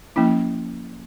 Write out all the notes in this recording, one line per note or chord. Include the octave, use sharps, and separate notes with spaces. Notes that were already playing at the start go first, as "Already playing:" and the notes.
F3 A#3 C#4 E4